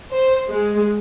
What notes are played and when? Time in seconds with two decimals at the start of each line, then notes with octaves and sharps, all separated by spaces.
0.12 C5
0.50 G#3